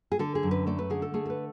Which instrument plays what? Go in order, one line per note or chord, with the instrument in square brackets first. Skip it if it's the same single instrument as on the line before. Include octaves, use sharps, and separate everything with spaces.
[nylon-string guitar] G#4
D3 A4
G#4
F#2
B4
A3 D5
B4
D3 G#4
A4
A3 G#4
A4
B4